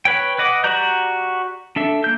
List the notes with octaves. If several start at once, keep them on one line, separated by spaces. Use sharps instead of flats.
B4 C#5 G5
B4 D#5 F#5 D6
F#4 G4 D5 A#5 G6
D4 A4 E5
A#3 G6